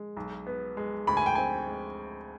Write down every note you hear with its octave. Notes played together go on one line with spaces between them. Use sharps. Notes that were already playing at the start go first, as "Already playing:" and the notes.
Already playing: G#3
B1
B3
G#3
D2 B5
G#5
G5
C4 G#5
G#3